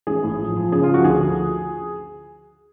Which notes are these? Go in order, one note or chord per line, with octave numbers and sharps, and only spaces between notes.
A1 G#4
A2
F3
F3
C#3 G#4
F4
F3
F#4
D2 G#4
F3